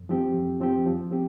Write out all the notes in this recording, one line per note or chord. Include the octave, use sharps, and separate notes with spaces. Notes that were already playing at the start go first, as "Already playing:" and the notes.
Already playing: F2
F3 C4 G4
F2
F3 C4 G4
F3
C4 G4